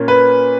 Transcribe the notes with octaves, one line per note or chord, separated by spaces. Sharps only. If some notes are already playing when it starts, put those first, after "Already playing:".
Already playing: A#2 A#3 C#4
B4